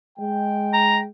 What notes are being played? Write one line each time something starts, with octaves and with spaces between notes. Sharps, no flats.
G#3 G5
A#5